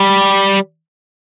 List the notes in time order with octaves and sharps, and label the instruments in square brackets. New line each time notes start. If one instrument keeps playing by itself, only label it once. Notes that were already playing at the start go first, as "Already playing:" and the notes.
Already playing: [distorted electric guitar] G3